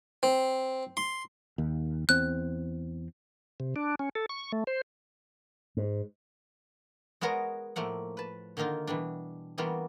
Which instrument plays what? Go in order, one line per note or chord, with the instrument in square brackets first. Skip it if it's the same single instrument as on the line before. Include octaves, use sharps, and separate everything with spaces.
[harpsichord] C4
C6
[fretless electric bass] D#2
[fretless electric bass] E2 C4 [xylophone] F#6
[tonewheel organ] C3
D4
C#4
A4
C#6
A3
C5
[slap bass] G#2
[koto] G#3 B3 F#4 A#4 C#5 D#5
A2 F3 A3 A#3 F#5
B4 A5
D3 D#3 A#3 D#4 F4
B2 E3 G3 D4
E3 G3 A#3 B3 F4 F#4